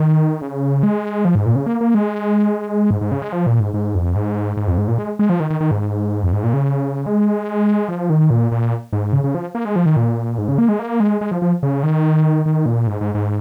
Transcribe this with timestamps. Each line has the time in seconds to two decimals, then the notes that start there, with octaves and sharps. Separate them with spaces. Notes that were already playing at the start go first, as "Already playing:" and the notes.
Already playing: D#3
0.42 C#3
0.83 G#3
1.25 F3
1.35 G#2
1.46 A#2
1.56 C#3
1.66 A#3
1.81 A#3
1.95 G#3
2.91 G#2
3.01 G#2
3.12 C#3
3.22 G#3
3.33 F3
3.47 A#2
3.60 G#2
3.74 G#2
3.95 F2
4.15 G#2
4.57 G#2
4.68 F2
4.78 G#2
4.88 A#2
4.98 G#3
5.19 G#3
5.30 F3
5.40 D#3
5.50 D#3
5.60 D#3
5.71 G#2
6.23 F2
6.33 G#2
6.44 A#2
6.53 C#3
7.06 G#3
7.88 F3
8.10 D#3
8.30 A#2
8.52 A#2
8.93 G#2
9.13 C#3
9.24 C#3
9.35 F3
9.55 A#3
9.65 G#3
9.76 F3
9.86 D#3
9.96 A#2
10.38 G#2
10.48 C#3
10.58 A#3
10.69 G#3
10.79 A#3
11.00 G#3
11.21 G#3
11.31 F3
11.42 F3
11.63 C#3
11.83 D#3
12.46 D#3
12.66 A#2
12.87 G#2
13.01 G#2
13.15 G#2